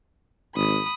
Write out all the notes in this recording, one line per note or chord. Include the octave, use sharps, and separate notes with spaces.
G#1 B5 D#6